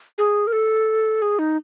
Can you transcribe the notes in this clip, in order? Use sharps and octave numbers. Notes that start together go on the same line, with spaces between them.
G#4
A#4
A4
G#4
D#4